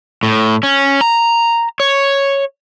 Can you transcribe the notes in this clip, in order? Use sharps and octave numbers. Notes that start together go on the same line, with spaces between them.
A2
C#4
A#5
C#5